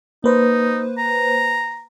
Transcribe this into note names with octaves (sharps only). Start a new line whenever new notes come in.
A#3 D#4 B4 C5
A#5